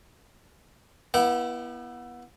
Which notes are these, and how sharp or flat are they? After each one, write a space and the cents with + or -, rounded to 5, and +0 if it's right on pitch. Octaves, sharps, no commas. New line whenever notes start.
B3 -30 E4 +10 G5 -40